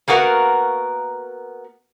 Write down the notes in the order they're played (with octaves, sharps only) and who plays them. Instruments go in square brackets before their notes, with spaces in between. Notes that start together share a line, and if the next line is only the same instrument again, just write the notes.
[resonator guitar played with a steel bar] A#3 B3 F#4 A#4 F5